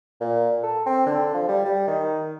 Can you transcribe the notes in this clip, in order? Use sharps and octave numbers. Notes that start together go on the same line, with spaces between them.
A#2
A4
C4
D3
F3
G3
G3
D#3